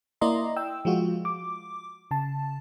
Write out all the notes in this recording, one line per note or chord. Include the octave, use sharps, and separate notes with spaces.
A#3 E4 D5 D#5 A#5 C6
G5 E6
F3 G#3 F4 F#4
D6
C#3 A5